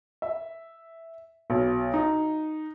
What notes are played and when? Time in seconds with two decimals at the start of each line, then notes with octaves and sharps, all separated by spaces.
0.22 E5
1.50 B1
1.94 D#4